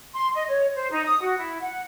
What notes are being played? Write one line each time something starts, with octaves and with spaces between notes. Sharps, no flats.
C6
D#5
C#5
C5
D#4
D#6
F#4
E4
F#5